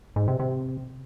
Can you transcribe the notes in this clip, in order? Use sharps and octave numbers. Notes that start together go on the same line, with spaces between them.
G#2
C3
C3